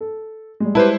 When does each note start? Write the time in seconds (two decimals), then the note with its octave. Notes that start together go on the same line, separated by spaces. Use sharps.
0.01 A4
0.60 G3 G#3
0.75 E4 G4 B4 C5 A5